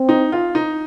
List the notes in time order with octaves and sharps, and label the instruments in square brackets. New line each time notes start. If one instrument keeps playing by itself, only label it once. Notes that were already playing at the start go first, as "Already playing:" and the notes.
Already playing: [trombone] C4
[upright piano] D#4
F4
D#4